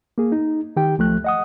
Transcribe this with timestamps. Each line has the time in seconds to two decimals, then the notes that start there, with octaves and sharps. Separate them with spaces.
0.18 A#3 G#4
0.32 D#4
0.76 D#3 G4 G5
0.98 C#2 F3 A3 F#6
1.24 D#5 F#5 D#6